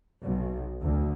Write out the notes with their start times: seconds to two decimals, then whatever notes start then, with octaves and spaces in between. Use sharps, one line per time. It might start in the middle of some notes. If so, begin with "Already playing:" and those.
0.22 B1
0.81 D2